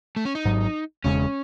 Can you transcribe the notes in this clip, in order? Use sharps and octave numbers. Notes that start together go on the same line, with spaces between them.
A3
C#4
D#4
G#1 G#2 F#3
E1 E2 C#3 G#3 C#4